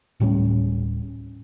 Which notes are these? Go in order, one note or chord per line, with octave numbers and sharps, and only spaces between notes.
D1 A2 G3 C#4